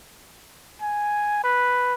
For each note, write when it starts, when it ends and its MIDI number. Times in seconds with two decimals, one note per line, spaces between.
0.82 1.43 80
1.44 1.94 71